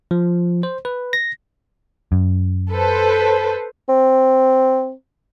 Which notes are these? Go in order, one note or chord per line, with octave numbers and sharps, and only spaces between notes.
F3
C5
B4
A#6
F#2
A4 B4 C5
C4